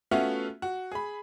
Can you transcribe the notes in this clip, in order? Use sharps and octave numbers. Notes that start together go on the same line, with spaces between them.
A3 B3 C#4 F4 F#4 E5
F#4
G#4 B5